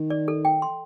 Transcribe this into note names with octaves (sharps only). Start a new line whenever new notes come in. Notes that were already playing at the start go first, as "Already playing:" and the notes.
Already playing: D#3
D5
A4
G5
C6